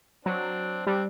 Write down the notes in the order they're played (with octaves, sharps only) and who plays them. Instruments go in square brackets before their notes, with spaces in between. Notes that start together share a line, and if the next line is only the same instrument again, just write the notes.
[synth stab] F#3 [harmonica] C4 D4
[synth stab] G3 [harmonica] C4 D4